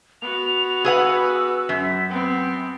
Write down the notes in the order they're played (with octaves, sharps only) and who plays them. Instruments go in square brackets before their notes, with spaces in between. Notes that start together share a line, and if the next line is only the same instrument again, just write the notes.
[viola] B3 F#4 [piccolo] F7
[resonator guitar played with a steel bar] G#4 B4 F#5 [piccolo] E6
[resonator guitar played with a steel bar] F#2 [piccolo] B6
[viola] B3 C4 [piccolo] G5